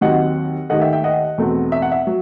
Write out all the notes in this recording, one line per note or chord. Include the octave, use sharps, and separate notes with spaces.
D#2 D#3 F#3 C4 D#5 F#5
D#2 D#3 A3 D#5 F#5
E5 G5
E5 G5
D#5 F#5
E2 B2 A3 C4
E5
F#5
E5
F#3